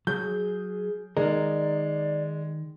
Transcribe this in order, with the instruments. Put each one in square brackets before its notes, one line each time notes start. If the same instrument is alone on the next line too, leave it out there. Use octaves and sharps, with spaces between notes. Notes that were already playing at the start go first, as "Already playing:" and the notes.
[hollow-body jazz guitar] F#3 [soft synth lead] G#4 [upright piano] G6
[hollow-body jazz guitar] D#3 A#4 [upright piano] G#3 [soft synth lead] D5